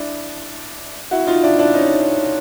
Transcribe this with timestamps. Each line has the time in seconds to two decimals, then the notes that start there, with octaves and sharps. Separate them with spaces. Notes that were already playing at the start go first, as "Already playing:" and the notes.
Already playing: D4 E4
1.11 E4 F#4
1.27 D#4 F4
1.43 D4 E4
1.59 D4 E4
1.74 C#4 D#4